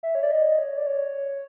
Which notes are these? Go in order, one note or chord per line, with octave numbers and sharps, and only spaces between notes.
E5
C#5
D5
D#5
C#5
D5
C#5